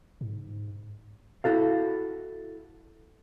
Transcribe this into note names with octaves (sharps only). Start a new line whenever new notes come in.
G#2
E4 F#4 A4 F5